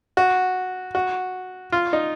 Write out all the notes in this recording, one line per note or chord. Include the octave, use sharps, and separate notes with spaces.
F#4
F#4
F4
D#4